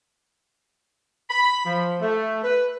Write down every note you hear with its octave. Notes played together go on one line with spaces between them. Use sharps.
B5
F3
A3
B4